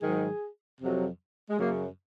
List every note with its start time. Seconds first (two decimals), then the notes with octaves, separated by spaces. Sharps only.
0.01 G#2 D#3 F#3 G#4
0.81 F2 C3 F#3
1.50 G#3
1.58 F#2 C#3 F#3 A#3